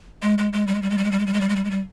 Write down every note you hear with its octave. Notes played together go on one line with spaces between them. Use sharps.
G#3
G#3
G#3
G3
G#3
G3
G#3
G3
G#3
G3
G#3
G3
G#3
G3
G#3
G3
G#3
G3